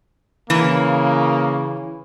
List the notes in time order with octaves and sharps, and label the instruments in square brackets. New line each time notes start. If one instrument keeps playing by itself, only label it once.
[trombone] C#3 [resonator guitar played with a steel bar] E3 [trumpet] A#3